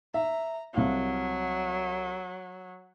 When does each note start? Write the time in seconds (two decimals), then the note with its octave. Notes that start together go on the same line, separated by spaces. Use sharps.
0.14 E5 A#5
0.74 C2 F#3 C4 F5